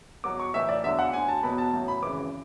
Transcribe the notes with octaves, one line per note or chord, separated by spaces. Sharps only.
E2 B2 F#3 D6
C#6
B1 A2 E3 E5
D5
E2 D3 F#3 E5
F#5
D2 D3 F#3 G#5
A5
E2 B2 F#3 B5
A5
A1 A2 F#3
B5
G#1 F#2 C#3 E3 D6